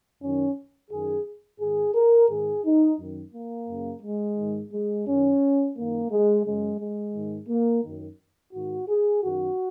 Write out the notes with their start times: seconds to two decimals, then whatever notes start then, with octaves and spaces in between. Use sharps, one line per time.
0.21 F#2 D#3 C#4
0.90 F#2 D#3 G#4
1.60 G#2 D#3 G#4
1.95 A#4
2.29 G#2 D#3 G#4
2.64 D#4
2.98 F#2 D#3
3.33 A#3
3.68 F#2 C#3
4.02 G#3
4.37 G#2 D#3
4.72 G#3
5.07 F#2 D#3 C#4
5.76 F#2 D#3 A#3
6.11 G#3
6.45 F#2 C#3 G#3
6.80 G#3
7.15 G#2 D#3
7.49 A#3
7.84 F#2 D#3
8.53 G#2 D#3 F#4
8.89 G#4
9.23 F#2 D#3 F#4